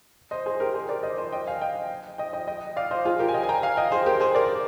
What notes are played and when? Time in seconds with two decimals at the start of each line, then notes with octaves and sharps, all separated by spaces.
0.31 C5 D#5
0.46 G#4 C5
0.60 G4 A#4
0.74 G#4 C5
0.89 A#4 D5
1.03 C5 D#5
1.18 C5 D#5
1.33 D#5 G5
1.47 F5 G#5
1.62 D#5 G5
2.18 D#5 G5
2.33 D#5 G5
2.47 D#5 G5
2.76 D5 F5
2.91 C5 D#5
3.05 F4 G#4
3.19 G4 A#4
3.28 G#5
3.34 D#5 G5
3.43 G#5
3.49 G5 A#5
3.63 F5 G#5
3.77 D#5 G5
3.92 G#4 C5
4.06 G4 A#4
4.20 G#4 C5
4.35 A#4 D5